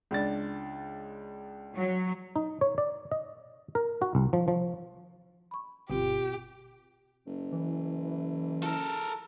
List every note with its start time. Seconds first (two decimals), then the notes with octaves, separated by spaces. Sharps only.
0.11 C#2 D4 A6
1.77 F#3
2.36 D#4
2.61 C#5
2.78 D5
3.12 D#5
3.75 A#4
4.02 F#4
4.15 C2
4.33 F3
4.48 F3
5.51 B5 C#6
5.90 G1 B2 C4 F4 G4
7.26 F#1
7.52 E3
8.63 A4 A#4